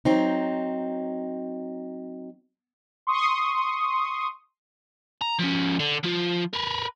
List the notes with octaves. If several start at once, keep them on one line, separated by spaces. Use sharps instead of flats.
F#3 C4 D#4
C6 C#6 D#6
A#5
F3 C#4
D3
F3 F4
A#4 B4